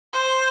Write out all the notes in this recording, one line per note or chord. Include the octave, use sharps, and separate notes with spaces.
C5